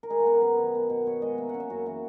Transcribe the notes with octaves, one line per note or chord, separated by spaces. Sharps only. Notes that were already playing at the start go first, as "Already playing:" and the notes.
A#4
G#3 G#4
F#4
B3 G#4
A#4
F#2 B4
D#3
B3
B2
B2 C#5
G#3 D#5
A#3 E5
C#4 F#5
E5
F#2 F#4
E3 F#4